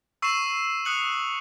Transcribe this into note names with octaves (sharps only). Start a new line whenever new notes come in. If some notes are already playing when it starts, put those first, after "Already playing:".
C#6 E6 C7 E7
D#6 F#6 C#7 F#7